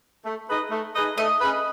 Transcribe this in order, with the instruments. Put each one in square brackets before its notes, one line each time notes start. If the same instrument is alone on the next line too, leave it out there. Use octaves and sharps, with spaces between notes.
[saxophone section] A3
D#4 G#4 B4 D#5
A3
D#4 G#4 B4 D#5
[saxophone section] A3 [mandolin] D#5
[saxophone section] C#4 G#4 B4